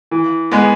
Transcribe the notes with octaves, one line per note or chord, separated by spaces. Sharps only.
E3
G#3 B3